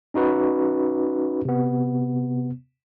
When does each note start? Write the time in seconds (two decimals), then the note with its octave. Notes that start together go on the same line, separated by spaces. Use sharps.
0.14 C#4 D#4 F#4 B4
1.45 C3 B3